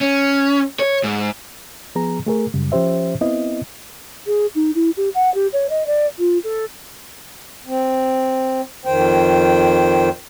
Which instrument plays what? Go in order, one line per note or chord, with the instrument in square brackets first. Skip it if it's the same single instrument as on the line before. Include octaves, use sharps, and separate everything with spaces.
[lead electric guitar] C#4
C#5
G#2
[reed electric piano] F3 B3 G#4 A#5
A3 G#4 A#4
F#2 C#3 G3
F3 C#4 G4 C5 E5
B3 C4 E4 D#5
[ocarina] G#4
D#4
E4
G4
F#5
G4
C#5
D#5
D5
F4
A4
[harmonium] C4
F2 D#3 C5 G5